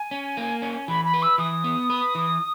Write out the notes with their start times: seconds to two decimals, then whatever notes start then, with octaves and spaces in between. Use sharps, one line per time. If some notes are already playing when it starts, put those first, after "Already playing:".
Already playing: G#5
0.11 C#4
0.37 A#3
0.62 C#4
0.88 E3 B5
1.05 B5
1.14 B4
1.22 E6
1.38 E3 D#6
1.64 B3
1.90 B4
2.15 E3